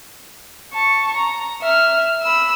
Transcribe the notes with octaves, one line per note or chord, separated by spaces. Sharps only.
A5 C#6
A#5
E5 F6
B5 E6